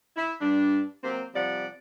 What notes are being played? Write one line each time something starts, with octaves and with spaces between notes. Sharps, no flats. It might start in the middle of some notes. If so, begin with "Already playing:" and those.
E4
G2 G3 D4
F#3 A#3 C4
C3 F3 G3 D5 F#5